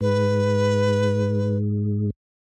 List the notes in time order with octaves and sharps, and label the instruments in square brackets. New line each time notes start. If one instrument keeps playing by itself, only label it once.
[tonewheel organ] G#2 [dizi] B4